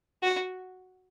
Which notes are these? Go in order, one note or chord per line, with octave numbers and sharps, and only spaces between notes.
F#4